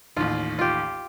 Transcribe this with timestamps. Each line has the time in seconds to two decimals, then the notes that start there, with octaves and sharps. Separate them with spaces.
0.17 A1 D#2 F4
0.59 F4 G4